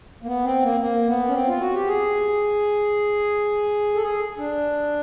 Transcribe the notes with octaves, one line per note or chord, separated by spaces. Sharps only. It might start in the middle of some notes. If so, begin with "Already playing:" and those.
A#3
B3
C4
A#3
A#3
B3
C#4
C4
F4
F#4
G4
G#4
A4
G#4
D4